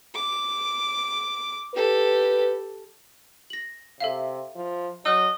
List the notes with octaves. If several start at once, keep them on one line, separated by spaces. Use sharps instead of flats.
D6
G4 A4 B4
A#6 F#7
C3 A4 E5 F5
F3
F#3 D#5 E6 F#6